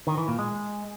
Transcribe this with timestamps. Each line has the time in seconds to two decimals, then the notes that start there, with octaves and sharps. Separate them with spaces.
0.07 D#3
0.17 E3
0.28 A#2
0.39 G#3